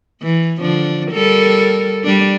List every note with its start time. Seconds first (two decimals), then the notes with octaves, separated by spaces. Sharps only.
0.22 E3
0.61 D3 F3 D4
1.12 G3 A4 A#4
2.04 G3 D4